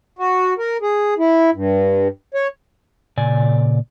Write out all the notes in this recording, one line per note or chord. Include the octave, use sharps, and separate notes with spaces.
F#4
A#4
G#4
E4
G2
C#5
A#2 C#3 D5 G#5